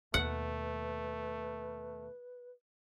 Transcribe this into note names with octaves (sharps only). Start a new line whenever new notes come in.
D#2 B2 A3 B4 F#5